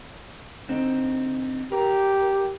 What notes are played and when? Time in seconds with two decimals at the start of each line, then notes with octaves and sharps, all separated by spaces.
0.69 D3 C4 D#4
1.72 G4 A#4